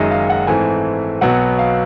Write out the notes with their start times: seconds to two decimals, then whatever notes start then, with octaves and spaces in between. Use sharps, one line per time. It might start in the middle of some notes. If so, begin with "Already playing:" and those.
Already playing: F#1 F#2 D#3 G#3 D#5 E5
0.11 F5
0.30 F#5
0.47 G#2 E3 A3 C4 G#5
1.21 B1 B2 F#3 B3 F#5
1.59 F5